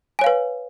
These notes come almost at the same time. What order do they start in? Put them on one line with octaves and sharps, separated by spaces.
G#5 C#5 F5 B4